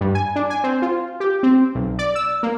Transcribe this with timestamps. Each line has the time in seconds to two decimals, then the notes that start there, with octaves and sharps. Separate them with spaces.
0.01 G2
0.15 G#5
0.36 D4
0.50 G#5
0.64 C4
0.82 F4
1.20 G4
1.43 C4
1.75 B1
1.99 D5
2.15 E6
2.43 A#3